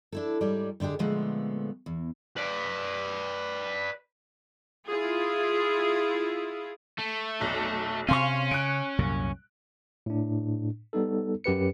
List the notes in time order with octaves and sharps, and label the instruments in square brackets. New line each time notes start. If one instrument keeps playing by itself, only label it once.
[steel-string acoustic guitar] D4 E4 A4
G#2 G3 C#5 D5
G#2 D3 D4 G4 G#4
A#2 D3 F3 G#3 A3 B3
E2
[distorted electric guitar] B4 D5
[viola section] E4 F4 G#4
[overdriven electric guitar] A3
[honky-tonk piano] F1 B1
[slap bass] C3 C4 [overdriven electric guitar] C#4 [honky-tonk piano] F5 C6 C#6
[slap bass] C#3 [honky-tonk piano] F#6 D7
[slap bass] C2 F#2 A#2
[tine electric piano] A2 D4
G3 B3 D#4 A4
F#2 G4 B4 C#7